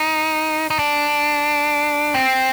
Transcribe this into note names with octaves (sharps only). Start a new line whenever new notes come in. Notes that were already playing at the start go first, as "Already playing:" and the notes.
Already playing: D#4
D#4
D4
C4